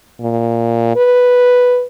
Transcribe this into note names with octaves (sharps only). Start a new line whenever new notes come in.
A#2
B4